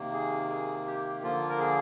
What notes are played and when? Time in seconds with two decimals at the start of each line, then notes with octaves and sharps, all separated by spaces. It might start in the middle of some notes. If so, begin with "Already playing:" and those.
Already playing: C3 D#3 A#3
0.13 G#4
0.50 G#4
0.87 G4
1.22 D3 F3 A#3 F4
1.49 A#4
1.59 G#4